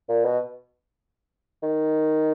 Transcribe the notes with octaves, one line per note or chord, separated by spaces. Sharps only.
A#2
B2
D#3